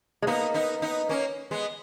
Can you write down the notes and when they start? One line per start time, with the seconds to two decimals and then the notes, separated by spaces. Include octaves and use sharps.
0.22 G#3
0.27 A#3 B3 D#4
0.54 B3 D#4
0.82 B3 D#4
1.09 A#3 C#4
1.51 G#3 B3